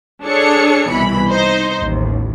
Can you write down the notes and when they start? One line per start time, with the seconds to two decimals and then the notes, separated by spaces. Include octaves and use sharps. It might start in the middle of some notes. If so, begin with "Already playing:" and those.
0.23 D4 G#4 A4 C#5 C#7
0.91 C2 B2 E3 B5
1.30 D#4 C5
1.81 A1 D#2